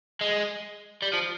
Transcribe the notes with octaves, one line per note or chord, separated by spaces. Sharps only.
G#3
G3
F3